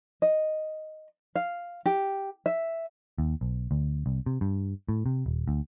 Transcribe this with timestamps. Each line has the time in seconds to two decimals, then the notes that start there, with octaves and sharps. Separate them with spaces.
0.22 D#5
1.35 F5
1.86 G4
2.46 E5
3.18 D#2
3.41 B1
3.71 D2
4.06 C2
4.26 C3
4.41 G2
4.89 A2
5.06 C3
5.26 D#1
5.48 D2